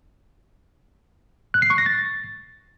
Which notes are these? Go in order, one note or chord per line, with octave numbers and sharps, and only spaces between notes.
F#6
C7
C#6
A#6
A6